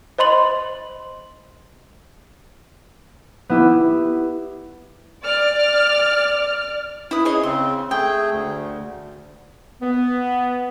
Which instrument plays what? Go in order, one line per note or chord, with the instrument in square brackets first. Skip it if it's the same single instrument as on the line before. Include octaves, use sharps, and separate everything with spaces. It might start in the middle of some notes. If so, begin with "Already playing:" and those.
[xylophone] C5 D#5 B5 C6 F#7
[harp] B3 E4 G4
[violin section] D5 F6
[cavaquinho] E4 B4 D#6
G#4 C#5 D#5
[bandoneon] C#3 C4 [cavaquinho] C6
[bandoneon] A3 G#4 [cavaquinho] G5
[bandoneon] D2
[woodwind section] B3